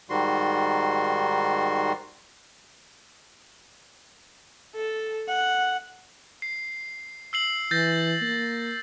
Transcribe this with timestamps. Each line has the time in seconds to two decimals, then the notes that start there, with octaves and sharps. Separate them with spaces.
0.10 G#2 D#3 G3 F#4 C6
4.75 A4
5.28 F#5
6.42 C7
7.33 E6 C7 F#7
7.71 E3 G6 A6 A#6
8.22 A#3